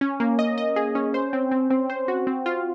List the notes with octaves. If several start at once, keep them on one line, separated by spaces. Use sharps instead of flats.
C#4
A#3
D#5
D#5
G#4
C#4
C5
C4
C4
C4
C5
F#4
C4
F4